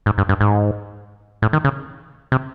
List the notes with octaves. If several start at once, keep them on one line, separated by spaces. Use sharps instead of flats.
G#2
G2
G2
G#2
A2
D#3
C#3
C3